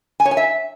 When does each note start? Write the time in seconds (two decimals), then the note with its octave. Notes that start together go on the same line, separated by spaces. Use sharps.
0.20 G#5
0.25 C#5
0.31 G#5
0.37 E5